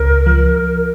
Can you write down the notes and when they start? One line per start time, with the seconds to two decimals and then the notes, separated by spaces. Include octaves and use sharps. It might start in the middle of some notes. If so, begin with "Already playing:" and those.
Already playing: C#2 A#4
0.26 F3